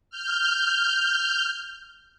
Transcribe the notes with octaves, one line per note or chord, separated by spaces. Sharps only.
F6 G6